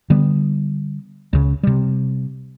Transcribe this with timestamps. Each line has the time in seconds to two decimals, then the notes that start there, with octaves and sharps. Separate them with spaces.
0.10 D3 G3 B3
1.33 C#2 C#3
1.63 C3 G3